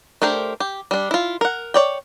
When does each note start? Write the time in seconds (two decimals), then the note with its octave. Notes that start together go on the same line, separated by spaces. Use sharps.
0.22 A3 D4 G4 A#4 C5
0.60 G4
0.91 G3 D4
1.11 E4 F4
1.41 A#4 F#5
1.74 C#5 D5 G5